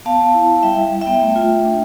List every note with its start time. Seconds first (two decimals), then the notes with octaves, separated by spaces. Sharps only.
0.05 B3 F5 A5
0.21 B3
0.34 E4
0.49 E4
0.63 G3 E5 G5
0.77 E4
0.92 G3
1.01 E5 G5
1.07 B3
1.21 A3
1.36 F4
1.50 A3
1.65 D4